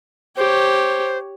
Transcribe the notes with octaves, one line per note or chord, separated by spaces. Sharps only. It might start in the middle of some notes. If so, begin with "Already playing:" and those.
G4 C5 C#5